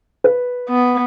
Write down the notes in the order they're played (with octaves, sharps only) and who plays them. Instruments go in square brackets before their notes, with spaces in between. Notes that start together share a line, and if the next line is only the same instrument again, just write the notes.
[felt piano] B4
[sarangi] B3